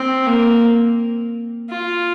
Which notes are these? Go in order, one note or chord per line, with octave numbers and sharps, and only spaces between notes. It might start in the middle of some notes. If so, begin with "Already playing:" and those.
Already playing: C4
A#3
F4